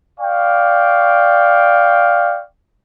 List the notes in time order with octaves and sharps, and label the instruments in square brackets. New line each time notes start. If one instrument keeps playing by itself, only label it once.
[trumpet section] D5 F5 G5 C#6